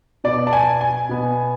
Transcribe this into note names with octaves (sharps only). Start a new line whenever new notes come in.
B2 B3 D5
A5
G#5
G#5
B2 B3